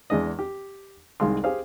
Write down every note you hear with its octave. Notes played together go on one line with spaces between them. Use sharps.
E2 G#3 D4 D#5
G4
C2 D#3 G#3 F5 C6
G4 G#4 C5 F5